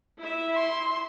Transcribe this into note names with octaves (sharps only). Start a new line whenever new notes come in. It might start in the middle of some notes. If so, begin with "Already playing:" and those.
E4 E5
C6